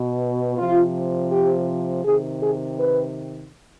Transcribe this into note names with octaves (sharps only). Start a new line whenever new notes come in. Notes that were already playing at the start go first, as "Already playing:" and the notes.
Already playing: B2
C3 F3 F4
G4
C3 D#3 G#4
G#4
B4